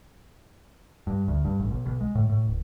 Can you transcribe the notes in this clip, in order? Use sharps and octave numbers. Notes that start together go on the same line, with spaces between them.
G2
D2
G2
A1
B1
B1
G#3
A2
A2
D1